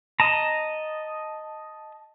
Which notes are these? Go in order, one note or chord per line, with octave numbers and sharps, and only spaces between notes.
D#5 A5 A#5